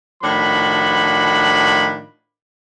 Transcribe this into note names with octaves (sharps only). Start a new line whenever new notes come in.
A2 D#3 F3 D4 F#4 B5